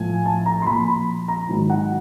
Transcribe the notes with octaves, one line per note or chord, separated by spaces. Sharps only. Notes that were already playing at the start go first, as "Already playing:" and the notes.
Already playing: A2 F3 G#5
A5
A#5
C6
A#2 F3 B5
A#5
G#2 D#3 F#3
F#5